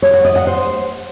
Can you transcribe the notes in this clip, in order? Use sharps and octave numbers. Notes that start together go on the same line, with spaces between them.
C#5
F#5
D#5
F#5
C5